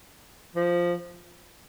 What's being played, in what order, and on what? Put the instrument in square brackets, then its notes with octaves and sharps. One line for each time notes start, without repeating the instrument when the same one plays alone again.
[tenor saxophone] F3